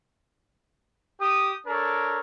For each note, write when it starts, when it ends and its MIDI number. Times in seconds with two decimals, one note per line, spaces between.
1.20 1.52 67
1.20 1.52 87
1.67 2.18 62
1.67 2.18 69
1.67 2.18 70
1.67 2.18 73